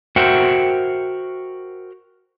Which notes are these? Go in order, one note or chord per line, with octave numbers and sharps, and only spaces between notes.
F#4 A#4 C5 E5 F#5 G5